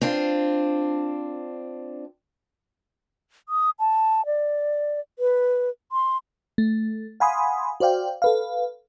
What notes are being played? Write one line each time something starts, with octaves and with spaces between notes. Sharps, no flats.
C4 D4 F4
D#6
A5
D5
B4
C6
A3
F5 F#5 G#5 B5 C6 D#6
F#4 C5 D5 F5 G5
A4 B4 F5